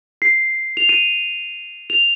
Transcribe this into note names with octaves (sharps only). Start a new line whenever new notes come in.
C7
F7
D#7
F7